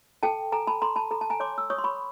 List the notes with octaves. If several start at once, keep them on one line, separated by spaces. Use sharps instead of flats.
A4 G5 A5
A4 G#5 A#5
A5 B5
A4 A#5 C6
A5 B5
A4 A#5
A5
G#5 A#5
C#5 C6 D6
E6
C#5 C#6 D#6
C6
B5 C#6